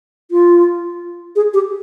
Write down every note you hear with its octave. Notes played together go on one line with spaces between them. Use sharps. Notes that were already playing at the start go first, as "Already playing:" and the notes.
F4
G#4
G4